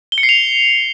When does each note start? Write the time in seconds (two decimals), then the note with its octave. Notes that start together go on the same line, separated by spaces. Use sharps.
0.12 G7
0.18 C#7
0.23 C7
0.29 F7